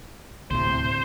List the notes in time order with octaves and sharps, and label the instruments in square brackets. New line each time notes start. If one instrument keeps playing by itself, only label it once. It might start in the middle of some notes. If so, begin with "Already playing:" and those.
[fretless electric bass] D2 A2 C3 [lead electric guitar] C5